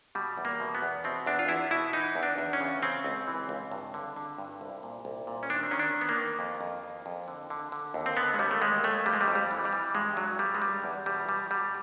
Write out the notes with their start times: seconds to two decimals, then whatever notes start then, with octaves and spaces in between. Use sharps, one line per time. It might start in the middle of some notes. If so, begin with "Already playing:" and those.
0.15 B2 G3
0.38 E2
0.45 A#3
0.60 B2
0.75 B3
0.82 E2
1.04 B2 C4
1.26 E2 D4
1.39 F4
1.49 E2 E4
1.71 B2 E4
1.93 E3 D#4
2.16 E2
2.23 D4
2.38 E2
2.53 C#4
2.60 C#3
2.83 C#3 C4
3.04 C#2
3.27 E3
3.49 C#2
3.71 G2
3.94 D3
4.16 D3
4.38 G2
4.61 C2
4.83 A#2
5.05 C2
5.27 A#2
5.43 C#4
5.49 D#3 D4
5.63 C4
5.71 D#3 C#4
5.79 D4
5.94 D#3
6.01 B3
6.09 A#3
6.17 D#3
6.39 F2
6.61 F2
6.83 F2
7.06 F2
7.28 D3
7.50 D3
7.72 D3
7.94 D#2
8.06 C4
8.17 D3 B3
8.34 G#3
8.39 D#2 G3
8.51 A3
8.62 D#2 G#3
8.84 D#2 A3
9.06 F2 G3
9.13 G#3
9.21 G3
9.28 F2
9.35 G3
9.51 E3
9.65 G3
9.73 E3
9.95 G2 G#3
10.17 G2 F#3
10.39 G2 G3
10.55 G#3
10.62 D3 G3
10.84 E2
11.06 B2 G3
11.29 B2 G3
11.51 B2 G3